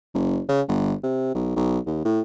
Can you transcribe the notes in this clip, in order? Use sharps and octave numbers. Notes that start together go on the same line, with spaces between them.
F#1
C#3
G1
C3
B1
B1
D#2
A2